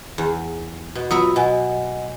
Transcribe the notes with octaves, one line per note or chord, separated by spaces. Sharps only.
E2
B2
F#3 B3 F4 E5 D#6
B2 D#5 F#5 G#5